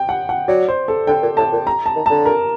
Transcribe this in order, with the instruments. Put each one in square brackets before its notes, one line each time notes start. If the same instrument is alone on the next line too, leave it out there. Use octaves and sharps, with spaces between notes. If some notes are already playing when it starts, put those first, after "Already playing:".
Already playing: [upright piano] G5
F#5
F#5
[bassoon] F#3 [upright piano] D5
[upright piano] C5
A4
[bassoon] D3 [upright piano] G5
[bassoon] A#2
[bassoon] A2 [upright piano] A5
[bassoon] A#2
[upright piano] A#5
A5
[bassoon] D#3
[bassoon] D3 [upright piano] A5
[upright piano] A#4